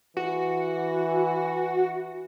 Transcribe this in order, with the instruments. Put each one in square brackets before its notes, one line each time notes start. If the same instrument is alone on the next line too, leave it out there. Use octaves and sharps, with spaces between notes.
[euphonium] E3 [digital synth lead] F#4